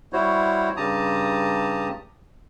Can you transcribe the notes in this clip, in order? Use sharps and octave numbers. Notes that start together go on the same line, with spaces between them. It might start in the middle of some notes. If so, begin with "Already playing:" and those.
G3 E4 F#4 C5 C#5
G2 C#3 G4 A5 A#5 D#6